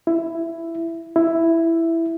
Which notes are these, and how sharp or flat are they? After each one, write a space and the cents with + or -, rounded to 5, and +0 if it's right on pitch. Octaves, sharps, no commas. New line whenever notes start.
E4 +10
E4 +5